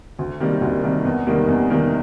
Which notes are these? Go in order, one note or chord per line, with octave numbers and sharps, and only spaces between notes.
D2
C3 D#3 G3 A#3
D2
C3 D#3 G3 A#3
E2
C3 D#3 G3 A#3
E2
C3 D#3 G3 A#3